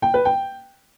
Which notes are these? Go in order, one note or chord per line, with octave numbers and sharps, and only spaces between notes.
G5
B4
G5